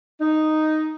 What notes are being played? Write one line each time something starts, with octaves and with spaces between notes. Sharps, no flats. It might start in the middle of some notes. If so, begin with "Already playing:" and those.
D#4